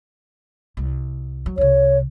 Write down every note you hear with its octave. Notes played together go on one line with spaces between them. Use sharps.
C2
F#3
C2 C3 C#5